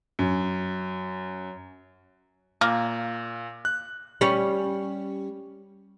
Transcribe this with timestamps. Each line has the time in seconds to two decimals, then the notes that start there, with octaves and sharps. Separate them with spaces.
0.19 F#2
2.61 A#2 A#3
3.65 F#6
4.21 G3 C#4